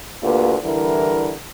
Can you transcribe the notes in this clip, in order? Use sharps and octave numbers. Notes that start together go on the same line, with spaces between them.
D2 A#3 F4 G4 B4
D3 E3 G3 E4 A#4